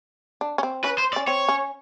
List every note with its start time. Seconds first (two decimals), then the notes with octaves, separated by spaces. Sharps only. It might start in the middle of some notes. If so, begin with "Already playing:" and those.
0.41 D4
0.58 C#4
0.63 C4
0.84 C#4 B4
0.98 C5
1.13 D5
1.16 C#4
1.27 C4 C#5
1.49 C#4